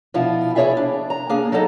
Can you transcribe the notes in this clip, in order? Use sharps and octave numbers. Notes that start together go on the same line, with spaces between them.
B2 F3 D4 E4 F4
E4 G#4 C#5 D5 E5 F5
D4
A#5
A#3 D4 G#4
F#3 G3 D#4 A4 D#5